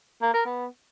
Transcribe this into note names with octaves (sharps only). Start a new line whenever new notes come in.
A#3
A#4
B3